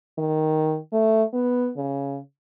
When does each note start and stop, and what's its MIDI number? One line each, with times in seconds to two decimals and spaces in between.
0.18 0.78 51
0.93 1.23 57
1.33 1.71 59
1.77 2.20 49